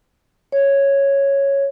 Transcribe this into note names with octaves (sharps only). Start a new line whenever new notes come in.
C#5